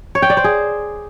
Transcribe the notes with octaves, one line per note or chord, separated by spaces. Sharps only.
C#5
G5
D5
C5
G#4